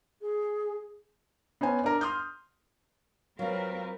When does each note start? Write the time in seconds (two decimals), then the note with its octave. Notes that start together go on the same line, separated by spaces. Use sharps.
0.21 G#4
1.61 B3 C#4 C5 G#5
1.84 D4 A#4
2.01 C6 D#6 F6 G6
3.39 F#3 C4 F4 A#4 B4 F5